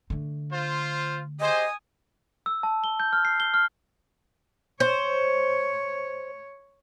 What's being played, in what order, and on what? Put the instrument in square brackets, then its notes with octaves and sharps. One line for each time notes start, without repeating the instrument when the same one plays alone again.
[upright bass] D3 A3
[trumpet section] F4 C5
[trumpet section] G4 G#4 C5 [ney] D#5 [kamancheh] G#5 D#6
[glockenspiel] E6
A5
G7
G6
F6
C7
G7
F6
[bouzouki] C5 [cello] C#5